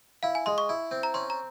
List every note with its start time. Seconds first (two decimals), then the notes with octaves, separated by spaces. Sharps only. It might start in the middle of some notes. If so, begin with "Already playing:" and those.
0.23 E4 F5
0.35 G#5
0.46 G#3 C6
0.58 C#6
0.69 E4
0.91 C4
1.03 A#5
1.14 C#4 C6
1.30 A#5